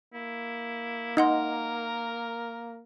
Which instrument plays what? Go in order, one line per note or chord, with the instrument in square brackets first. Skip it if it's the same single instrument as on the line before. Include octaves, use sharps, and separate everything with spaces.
[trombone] A#3 [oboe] E4
[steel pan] D#4 [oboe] A#4 [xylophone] D#5 F#5 C6